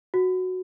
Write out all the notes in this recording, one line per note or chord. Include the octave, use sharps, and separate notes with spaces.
F#4